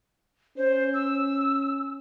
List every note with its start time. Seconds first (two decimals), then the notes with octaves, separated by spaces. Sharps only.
0.57 C#4 C5
0.94 E6